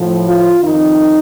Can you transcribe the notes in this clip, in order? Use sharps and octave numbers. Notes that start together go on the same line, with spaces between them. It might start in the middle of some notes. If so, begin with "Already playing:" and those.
Already playing: A2 F3
F4
F2 D#3 D#4